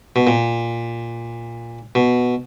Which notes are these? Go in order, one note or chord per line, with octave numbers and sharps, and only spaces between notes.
B2
A#2
B2